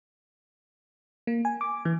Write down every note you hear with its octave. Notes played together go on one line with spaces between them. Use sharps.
A#3
G#5
D6
E3